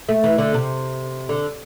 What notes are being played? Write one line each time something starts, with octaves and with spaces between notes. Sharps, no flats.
A3
E3
D3
C3
D3